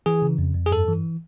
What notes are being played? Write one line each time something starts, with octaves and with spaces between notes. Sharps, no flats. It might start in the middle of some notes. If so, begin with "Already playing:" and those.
E3 G#4
C#3
F2
F2
G#4
G2 A4
E3